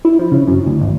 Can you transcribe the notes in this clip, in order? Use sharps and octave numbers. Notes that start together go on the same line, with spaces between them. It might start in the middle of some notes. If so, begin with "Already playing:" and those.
E4
F3
C#3
F#2
D2
G#1